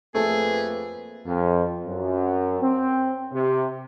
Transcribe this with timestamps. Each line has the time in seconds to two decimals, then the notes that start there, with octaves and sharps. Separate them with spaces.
0.15 F2 A3 A#3 G#4 B4
1.26 F2
1.86 F#2
2.61 C4
3.32 C3